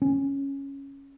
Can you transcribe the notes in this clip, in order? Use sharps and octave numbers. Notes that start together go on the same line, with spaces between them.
C#4